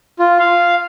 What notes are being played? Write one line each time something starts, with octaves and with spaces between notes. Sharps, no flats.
F4
F5